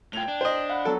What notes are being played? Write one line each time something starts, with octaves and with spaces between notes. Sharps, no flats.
A2 F4 G5 G#6 F7
D4
C5 D#5
F5 F#5 B5
F#3 B3 A4